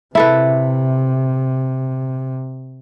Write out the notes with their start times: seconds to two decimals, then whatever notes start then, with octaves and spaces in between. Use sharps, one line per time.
0.15 C3 E4 A4 B4